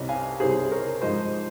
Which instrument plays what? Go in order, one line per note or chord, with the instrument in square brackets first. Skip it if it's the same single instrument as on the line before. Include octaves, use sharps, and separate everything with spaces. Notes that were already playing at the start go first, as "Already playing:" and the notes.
Already playing: [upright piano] C2 C3 G3 C#4 D#5
F5 G#5
C2 C3 G3 C#4 G#4 C5
A#4 C#5
G#2 F3 G#3 C5 D#5